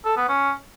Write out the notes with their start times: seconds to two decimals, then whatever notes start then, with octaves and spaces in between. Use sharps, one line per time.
0.05 A4
0.17 B3
0.28 C#4